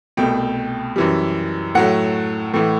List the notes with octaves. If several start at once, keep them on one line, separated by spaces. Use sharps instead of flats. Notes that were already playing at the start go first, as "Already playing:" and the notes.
C2 B2 A3 G5
F#2 E3 G3
A2 F#3 A3 F#5
A2 E3 A3